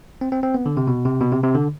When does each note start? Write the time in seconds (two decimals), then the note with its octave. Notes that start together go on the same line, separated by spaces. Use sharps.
0.21 C4
0.32 C4
0.43 C4
0.55 B3
0.66 D3
0.77 C3
0.87 B2
1.05 C3
1.21 B2
1.32 C3
1.43 C3
1.55 D3